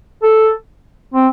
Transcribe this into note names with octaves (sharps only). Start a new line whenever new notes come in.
A4
C4